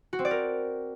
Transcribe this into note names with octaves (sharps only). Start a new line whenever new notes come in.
F#4
C4
D5
A#4